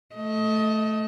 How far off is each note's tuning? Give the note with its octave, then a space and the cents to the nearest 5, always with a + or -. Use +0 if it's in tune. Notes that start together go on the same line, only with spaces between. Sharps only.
A3 -5 D#5 +25